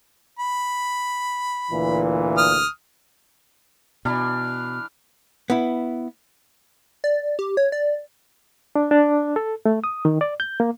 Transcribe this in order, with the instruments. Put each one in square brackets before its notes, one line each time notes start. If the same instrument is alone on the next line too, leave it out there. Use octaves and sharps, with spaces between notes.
[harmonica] B5
[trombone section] D2 A#2 E3
[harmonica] D#6 F6
[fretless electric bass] B2 [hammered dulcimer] E3 D4 B5 [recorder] F6
[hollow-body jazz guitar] B3 E4
[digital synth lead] D5
G4
C#5
D5
[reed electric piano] D4
D4
A4
A3
D#6
D#3
D5
G6
A#3